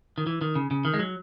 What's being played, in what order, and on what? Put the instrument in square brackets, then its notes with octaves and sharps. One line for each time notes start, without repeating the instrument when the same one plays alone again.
[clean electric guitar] D#3
E3
D#3
C#3
C#3
D#3
G#3
F#3